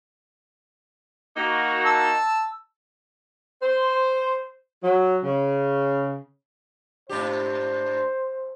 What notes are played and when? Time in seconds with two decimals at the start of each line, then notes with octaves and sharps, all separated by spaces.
1.36 A#3 D#4 F#4
1.85 A5 E6
3.62 C5
4.83 F#3
5.24 C#3
7.09 G#2 D4 G4 C5